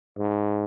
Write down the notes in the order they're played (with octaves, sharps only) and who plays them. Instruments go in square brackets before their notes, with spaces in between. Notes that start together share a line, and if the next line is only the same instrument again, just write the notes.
[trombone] G#2